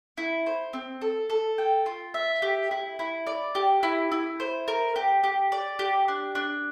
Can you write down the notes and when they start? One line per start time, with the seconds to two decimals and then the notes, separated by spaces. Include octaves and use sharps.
0.18 E4
0.46 C5
0.73 C4
1.01 A4
1.30 A4
1.58 G5
1.86 F4
2.14 E5
2.42 G4
2.71 E4
2.99 E4
3.27 D5
3.55 G4
3.83 E4
4.12 E4
4.40 C5
4.68 A#4
4.96 G4
5.23 G4
5.52 D5
5.79 G4
6.08 D4
6.35 D4